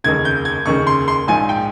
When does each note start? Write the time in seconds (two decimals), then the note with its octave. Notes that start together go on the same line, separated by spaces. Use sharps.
0.04 F1 D#2 C#3 G#6
0.25 G6
0.45 G#6
0.66 F1 D#2 C#3 C#6
0.87 C6
1.08 C6
1.28 A#1 G#2 F3 G#5
1.49 G5